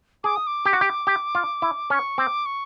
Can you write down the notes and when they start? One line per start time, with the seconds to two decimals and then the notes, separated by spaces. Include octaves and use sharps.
0.24 G#4 D6
0.36 D#6
0.47 D6
0.65 G4
0.73 F#4
0.81 G4
1.07 G4
1.35 F4
1.62 E4
1.90 C#4 C#6
2.18 C4 D6
2.46 C#6